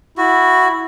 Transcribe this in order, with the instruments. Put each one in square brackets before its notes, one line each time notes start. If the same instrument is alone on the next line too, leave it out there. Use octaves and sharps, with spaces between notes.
[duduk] E4 [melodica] F#4